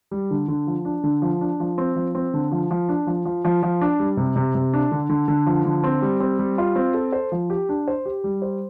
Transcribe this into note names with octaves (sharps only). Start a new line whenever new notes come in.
G3
D3
D3
F3
D4
D3
F3
D4
F3
C4
F3
C4
D3
F3
F3
D4
F3
F3
F3
F3
D4
G3
C3
C3
C3
D4
D3
D3
D3
F3
D3
C4
G3
C4
G3
F4
C4
A4
C5
F3
G4
D4
C5
G4
G3
C5